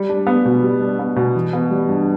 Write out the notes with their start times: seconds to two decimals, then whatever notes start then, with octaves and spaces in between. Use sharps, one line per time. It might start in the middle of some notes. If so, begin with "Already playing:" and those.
Already playing: G3
0.09 D4
0.27 B3
0.45 B2
0.63 G3
0.81 D4
0.99 B3
1.16 B2
1.35 E3
1.53 B3
1.70 G3
1.89 G2